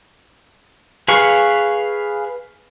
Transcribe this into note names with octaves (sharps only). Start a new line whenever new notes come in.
G#4 B4 F5 C#6